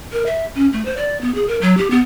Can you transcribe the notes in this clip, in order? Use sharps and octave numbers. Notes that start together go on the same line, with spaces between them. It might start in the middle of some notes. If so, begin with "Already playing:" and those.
A#4
E5
C#4
A3
C5
D5
B3
G#4
A#4
F#3
G4
B3